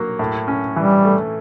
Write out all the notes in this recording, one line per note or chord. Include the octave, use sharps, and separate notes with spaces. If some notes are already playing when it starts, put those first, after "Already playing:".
Already playing: F#3 A#3
A2
C#4
E3 G3
A3